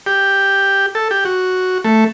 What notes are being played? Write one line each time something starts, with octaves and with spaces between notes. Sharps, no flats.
G4
A4
G4
F#4
A3